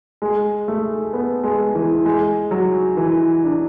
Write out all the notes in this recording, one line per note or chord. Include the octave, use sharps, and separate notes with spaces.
G#3
A3
B3
G#3
E3
G#3
F#3
E3
D4